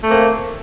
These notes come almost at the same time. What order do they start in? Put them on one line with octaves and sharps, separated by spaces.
A3 C4 A#3